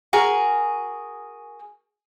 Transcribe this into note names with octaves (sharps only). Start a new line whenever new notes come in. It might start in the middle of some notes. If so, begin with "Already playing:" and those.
F#4 G#4 A#4 G#5